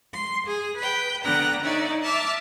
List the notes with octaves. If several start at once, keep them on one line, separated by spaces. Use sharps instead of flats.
C6
G#4
B4 G5
D3 B3 G5 A#5 F#6
D#4 C#5 D5 E5
E5 A5 D6 F6